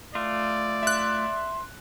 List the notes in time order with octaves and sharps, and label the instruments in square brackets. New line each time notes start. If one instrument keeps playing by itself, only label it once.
[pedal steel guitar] A3 F4 [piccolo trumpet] D5
[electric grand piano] E5 F#6 [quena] C6